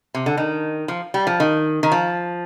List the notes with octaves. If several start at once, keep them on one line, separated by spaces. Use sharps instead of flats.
C3
D3
D#3
F3
G3
F3
D#3
D#3
F3